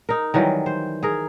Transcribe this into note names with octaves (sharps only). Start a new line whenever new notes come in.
D#4 A#4
D#3 E3 F#3 G3
C5
G#4 A#4